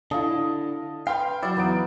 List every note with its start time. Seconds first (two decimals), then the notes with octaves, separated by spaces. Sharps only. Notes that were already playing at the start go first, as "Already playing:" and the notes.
0.11 D3 E4 D#5 F5 A5
1.07 B4 F5 G5 C6 F6
1.43 F#3 E4 F#4 D5
1.57 E2 B3 D#4 D7